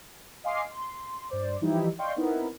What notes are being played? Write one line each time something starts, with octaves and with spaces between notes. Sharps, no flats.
D#5 F5 G#5 C6 D6 C7
C6
G2 C5 D5
E3 F3 G3 D#4 E4 G4
D5 D#5 F5 G5 C6 C#6
B3 C4 D#4 E4 A#4